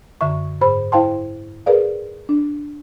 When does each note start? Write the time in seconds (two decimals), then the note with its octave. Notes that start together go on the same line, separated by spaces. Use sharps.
0.21 F#2 D3 E5 C#6
0.61 G#2 C5 B5
0.92 E4 C5 F5 G5 A5 C6
1.66 G#4 A#4 B4 D5 F5
2.29 D4